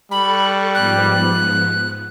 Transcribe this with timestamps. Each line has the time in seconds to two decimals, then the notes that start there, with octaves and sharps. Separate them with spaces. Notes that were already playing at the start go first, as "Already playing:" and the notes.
0.11 G3 A4 B5 C#6 F#6
0.75 G#2 F3 B3 F#6